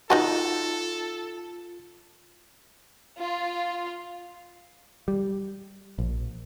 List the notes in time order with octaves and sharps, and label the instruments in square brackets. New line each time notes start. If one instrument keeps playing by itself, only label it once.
[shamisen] D#4 D#5 A5 [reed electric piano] F4 [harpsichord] F#4 [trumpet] A4
[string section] F4
[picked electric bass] G3
A#1